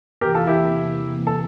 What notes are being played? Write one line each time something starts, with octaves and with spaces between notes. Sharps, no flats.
E2 C3 E3 A#3 G4 A#4
F4 A4
E4 G4
A4